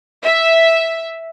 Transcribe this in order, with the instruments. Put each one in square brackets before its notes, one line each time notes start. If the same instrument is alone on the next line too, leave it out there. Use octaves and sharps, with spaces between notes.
[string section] E5